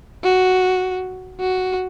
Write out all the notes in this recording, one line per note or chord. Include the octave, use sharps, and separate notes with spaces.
F#4
F#4